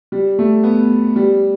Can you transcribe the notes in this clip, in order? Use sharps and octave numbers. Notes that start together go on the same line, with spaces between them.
G3
A3
B3
G3